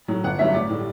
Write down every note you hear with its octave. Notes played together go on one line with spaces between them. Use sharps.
A2 F#3
G1 F#5
G2 F#3 E5
A1 D5
A2 G3